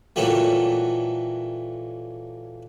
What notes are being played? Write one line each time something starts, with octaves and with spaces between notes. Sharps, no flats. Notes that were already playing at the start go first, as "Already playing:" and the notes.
A#2 E3 F#3 G3 A3